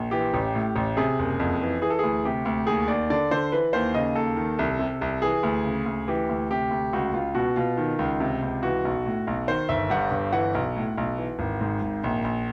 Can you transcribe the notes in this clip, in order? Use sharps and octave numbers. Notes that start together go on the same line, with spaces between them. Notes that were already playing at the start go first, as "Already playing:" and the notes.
Already playing: A#1
E3 G4
A1
A2
A1
C3 G#4
F#1
F2
E3
E3 G#4
A4
D2 G#4
C3 G4
D2
D#2 G#4
D#2 D5
D3 D5
D3 C5
E3 B4
D#2 C5
C#3 D#5
D#2 A4
D#3
C2
C3
C2
E3 G#4
D2
C#3
D2
E3 G4
D2
C3 G4
D2
C#2 F#4
C#2 F4
B2 F#4
B2 F4
D#3
C#2
C3
C#2
E3 F#4
B1
A2
B1
D#3 C5
G1 E5
G2 F#5
G1
E3 F#5
B1
A2
B1
E3
G#1
G#2
G#1
A#1
A#1